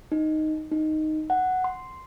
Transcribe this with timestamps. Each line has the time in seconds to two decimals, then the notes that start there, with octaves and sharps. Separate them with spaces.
0.12 D#4
0.71 D#4
1.30 F#5
1.64 C6